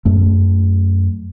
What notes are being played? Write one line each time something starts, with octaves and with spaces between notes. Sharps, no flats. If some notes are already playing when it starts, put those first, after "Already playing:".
F#2 A3